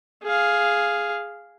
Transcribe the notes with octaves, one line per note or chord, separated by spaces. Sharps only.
G#4 F5